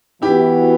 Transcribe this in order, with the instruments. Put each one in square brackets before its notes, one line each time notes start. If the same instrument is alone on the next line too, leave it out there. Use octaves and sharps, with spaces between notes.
[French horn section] E3 B3 F#4 [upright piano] E4 G4